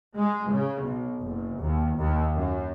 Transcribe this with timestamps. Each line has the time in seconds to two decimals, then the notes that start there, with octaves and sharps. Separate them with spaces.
0.17 G#3
0.51 C#3
0.83 B1
1.22 F#1
1.60 D#2
1.98 D#2
2.36 F#2